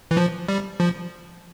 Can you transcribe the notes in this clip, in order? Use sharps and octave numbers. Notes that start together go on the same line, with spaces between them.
E3
F3
G3
F3